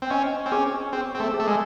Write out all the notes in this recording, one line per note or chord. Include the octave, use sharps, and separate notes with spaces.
C4
C#4 D#5
C4
C#4 G#4
C4 G#4
C4
A3
G#4
A3
G#3